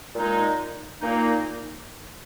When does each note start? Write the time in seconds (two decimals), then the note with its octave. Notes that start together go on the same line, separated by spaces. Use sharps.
0.14 A#2 G#3 D#4
1.01 A#2 A#3 D#4